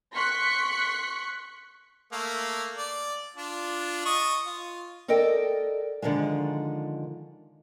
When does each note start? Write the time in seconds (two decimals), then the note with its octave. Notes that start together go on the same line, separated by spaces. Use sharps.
0.14 C6 C#6 F#6 B6 C#7
2.12 A3 A#3
2.76 D5
3.36 D4 F4
4.05 D#5 C#6
4.46 F4
5.08 A4 A#4 D5 D#5 G5
6.02 D3 D#3 F3 G#3